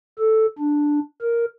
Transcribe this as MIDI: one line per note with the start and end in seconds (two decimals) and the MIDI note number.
0.18 0.46 69
0.59 1.00 62
1.21 1.45 70